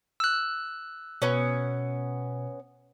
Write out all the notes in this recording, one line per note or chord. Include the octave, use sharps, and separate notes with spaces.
E6 F#6
B2 B3 C#4